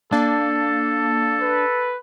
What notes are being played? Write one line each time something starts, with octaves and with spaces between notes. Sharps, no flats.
A#3 D4 A4
B4